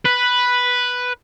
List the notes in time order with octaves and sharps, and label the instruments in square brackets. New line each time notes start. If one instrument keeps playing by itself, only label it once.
[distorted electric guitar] B4